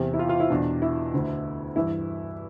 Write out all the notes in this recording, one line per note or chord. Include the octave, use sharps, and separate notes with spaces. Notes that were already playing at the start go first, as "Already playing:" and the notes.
Already playing: E2 C3 E3 G4
E4
F4
F4
E4
E2 B2 D4
E4
D2 D3
G2 E3 E4